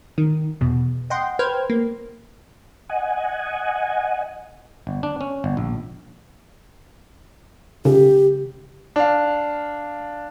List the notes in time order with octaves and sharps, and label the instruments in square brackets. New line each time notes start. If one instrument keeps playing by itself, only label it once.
[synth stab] D#3
E2 B2
D#5 F#5 G5 C6
B4 C5 G5 F6 G#6
A#3
[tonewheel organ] D#5 F#5 G#5
[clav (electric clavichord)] G1
D4
C#4
G1
A#1
[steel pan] C#3 [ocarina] G4
[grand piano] D4 F5